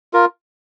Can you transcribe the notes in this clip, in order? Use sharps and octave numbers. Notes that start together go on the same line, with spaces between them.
F4 A#4